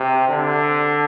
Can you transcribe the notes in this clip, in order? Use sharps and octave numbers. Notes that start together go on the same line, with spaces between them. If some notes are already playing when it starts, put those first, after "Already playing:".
Already playing: C3
D3